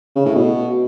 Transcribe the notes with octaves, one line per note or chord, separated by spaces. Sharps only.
C#3
A2
B2